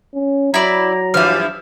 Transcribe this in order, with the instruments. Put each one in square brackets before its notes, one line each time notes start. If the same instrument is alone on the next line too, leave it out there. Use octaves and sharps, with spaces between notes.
[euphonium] C#4
[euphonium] F#3 [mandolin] E4 D5 [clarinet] A#5
[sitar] G2 E3 F3 [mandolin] E5 F6